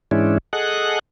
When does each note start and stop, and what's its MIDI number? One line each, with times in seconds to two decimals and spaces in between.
0.11 0.38 44
0.11 0.38 52
0.11 0.38 56
0.11 0.38 61
0.11 0.38 62
0.11 0.38 64
0.53 0.99 68
0.53 0.99 69
0.53 0.99 75
0.53 0.99 78
0.53 0.99 90